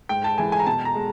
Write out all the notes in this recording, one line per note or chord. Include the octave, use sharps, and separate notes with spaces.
G#2 G5
A5
E3 G#3 G#5
G#5
A#5
B2 A5
A#5
G#3